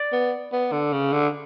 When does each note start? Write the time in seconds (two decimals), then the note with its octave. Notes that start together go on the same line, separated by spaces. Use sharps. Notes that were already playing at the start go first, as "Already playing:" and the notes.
Already playing: D5
0.12 B3
0.52 B3
0.72 D3
0.93 C#3
1.12 D3